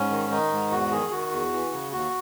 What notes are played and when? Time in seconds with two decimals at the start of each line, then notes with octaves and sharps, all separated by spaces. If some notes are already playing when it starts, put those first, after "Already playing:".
Already playing: G#2 C#4
0.10 D#3
0.31 D#3 D#4
0.51 G#2
0.71 E2 F#4
0.91 D#3 G#4
1.11 D#3 F#4
1.31 E2
1.53 E3
1.72 C#3
1.92 D#2 F#4